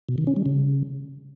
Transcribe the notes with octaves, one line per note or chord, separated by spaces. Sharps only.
B2
D#3
C#4
G3
C#3